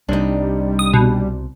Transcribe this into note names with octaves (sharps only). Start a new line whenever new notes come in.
C2 C3 G3 D4 D#4
D#6
B2